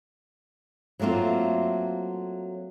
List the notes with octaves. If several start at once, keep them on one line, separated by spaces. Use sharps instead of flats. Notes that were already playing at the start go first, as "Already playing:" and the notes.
F#3 A3 A#3 C4 F4